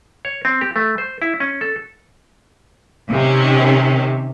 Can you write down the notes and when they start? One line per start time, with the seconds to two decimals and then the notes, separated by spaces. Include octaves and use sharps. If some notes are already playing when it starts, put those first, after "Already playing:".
0.25 C#5
0.45 C4
0.61 G4
0.76 A3
0.98 C5
1.22 E4
1.40 C#4
1.61 A4
3.10 C3 D#3 C#4